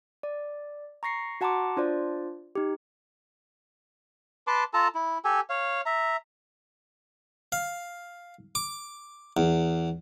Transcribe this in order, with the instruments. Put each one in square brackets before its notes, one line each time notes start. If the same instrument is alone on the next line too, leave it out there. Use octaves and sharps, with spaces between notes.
[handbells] D5
A#5 C#6 A#6 C7 C#7
F#4 F#5 A5 A#5 C6 D6
D4 F4 C5 D5
D#4 G4
[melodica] B4 A5 C6 D6
F4 A4 A5 A#5
E4
G4 A4 G#5
C#5 F5
E5 A#5
[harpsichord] F5
D6
E2